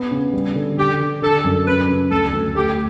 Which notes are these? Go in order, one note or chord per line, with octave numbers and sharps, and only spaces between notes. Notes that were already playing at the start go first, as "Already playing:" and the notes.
Already playing: B3
C#3
G3
D3
D3 G4
D3
D3 A4
F#2
C#4 B4
C#3
D2 A4
D2
A3 G4